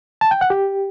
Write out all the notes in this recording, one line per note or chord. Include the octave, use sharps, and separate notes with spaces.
A5
G5
F#5
G4